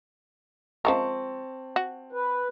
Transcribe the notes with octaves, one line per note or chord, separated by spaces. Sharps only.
F3 G#3 C4 A#4 A5 C#6
F#4
B4